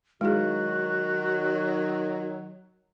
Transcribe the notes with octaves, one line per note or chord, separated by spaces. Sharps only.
D#3 F#3 G#3 E4 F#4 G#4